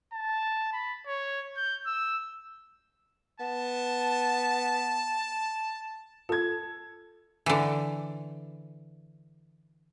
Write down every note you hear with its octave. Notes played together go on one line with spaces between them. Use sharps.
A5
B5
C#5
G6
E6
B3 A5
F4 A4 G#6
D3 E3